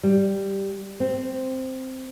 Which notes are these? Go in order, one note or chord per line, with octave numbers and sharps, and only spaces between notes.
G3
C4